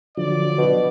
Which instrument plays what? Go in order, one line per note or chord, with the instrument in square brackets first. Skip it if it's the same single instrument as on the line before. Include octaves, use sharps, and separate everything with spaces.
[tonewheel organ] D3 F3 F#3 [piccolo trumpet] D5
[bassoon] B2